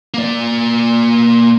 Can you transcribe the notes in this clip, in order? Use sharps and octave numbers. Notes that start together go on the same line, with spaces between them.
A#3 D5